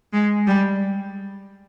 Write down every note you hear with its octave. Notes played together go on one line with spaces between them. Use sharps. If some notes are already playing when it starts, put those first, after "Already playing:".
G#3
G3